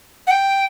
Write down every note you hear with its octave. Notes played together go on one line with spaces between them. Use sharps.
F#5
G5